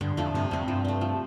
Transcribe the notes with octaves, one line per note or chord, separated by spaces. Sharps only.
G2 D3
F2 F3 A3
G2 C3
F2 G3 C4
G2 F3
A3 C4
F3